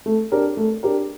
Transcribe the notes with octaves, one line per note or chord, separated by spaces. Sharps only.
A3
D4 G4 A#4
A3
D4 G4 A#4